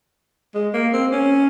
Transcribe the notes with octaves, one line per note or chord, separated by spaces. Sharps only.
G#3
A#3
C4
C#4